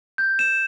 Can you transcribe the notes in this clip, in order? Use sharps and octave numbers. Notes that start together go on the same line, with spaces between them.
G6
E7